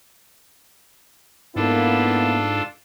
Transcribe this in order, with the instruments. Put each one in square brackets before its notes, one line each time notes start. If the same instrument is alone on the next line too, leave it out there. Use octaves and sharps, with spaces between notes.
[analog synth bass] G#2 [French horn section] A#3 B3 E4 [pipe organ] D4 F4 A4